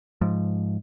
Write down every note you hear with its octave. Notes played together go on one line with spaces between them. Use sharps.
G#2 F3